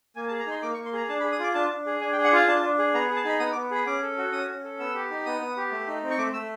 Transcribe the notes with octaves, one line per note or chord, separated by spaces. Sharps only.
A#3 G#5
A5
G#4
A#5
D#4 C6
A#3 D6
C#6
A#3
C6
G#4 A#5
D4 A5
B5
G#4
D#6
F4 D6
D4 A5
D4
G#4
D4 G#5
G5
G#4
F#5
F4 F5
D4 A5
D4
G#4
B3 A#5
G#4
A5
D#4 B5
B3 D#6
D6
B3
G#4 B5
C#4 D6
A4
F#4
C#4 D#6
C#4
A4
B3 E6
G4
D#4
B3 D#6
B3
G4
A3
D#4
C4
C#6
A3 D6
A3 E6